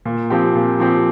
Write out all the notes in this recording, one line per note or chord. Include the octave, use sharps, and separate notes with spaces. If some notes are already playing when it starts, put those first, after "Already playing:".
A#2
F3 C4 G4
A#2
F3 C4 G4